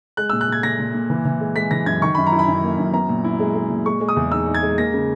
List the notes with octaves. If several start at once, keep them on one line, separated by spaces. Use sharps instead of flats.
G#3 F#6
A#2 E6
F#6
A#2 G#6
A#2 A#6
A#2
A#2
E3
E3
G#3
G#3 B6
E3 A#6
F#2 G#6
D#3 C#6
F#2 B5
A#5
E4
B5
F#2
A#3
F#2
B3 A#5
A#2
E4
G#3
G#3
A#2
G#3 C#6
G#3
D#6
E2
D#4 E6
D#4
G#6
G#3
A#3 A#6
C#3